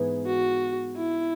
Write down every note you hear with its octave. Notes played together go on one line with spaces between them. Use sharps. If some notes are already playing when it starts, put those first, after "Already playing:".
Already playing: G#2 E3 B3 G#4
F#4
E4